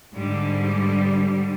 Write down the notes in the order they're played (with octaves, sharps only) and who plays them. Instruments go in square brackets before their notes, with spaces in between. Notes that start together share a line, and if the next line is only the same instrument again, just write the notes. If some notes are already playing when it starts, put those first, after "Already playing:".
[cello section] G#2 D3 G3